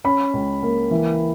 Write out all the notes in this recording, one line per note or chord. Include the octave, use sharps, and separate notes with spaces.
C#4 B5
C#2
A#3
E3